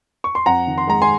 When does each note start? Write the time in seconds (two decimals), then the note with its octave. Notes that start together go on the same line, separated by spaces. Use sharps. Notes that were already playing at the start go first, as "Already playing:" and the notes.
0.24 C#6
0.35 C6
0.46 F2 F#5 A#5
0.67 D#3
0.78 C6
0.87 G#3 A#5
1.02 G#5 C6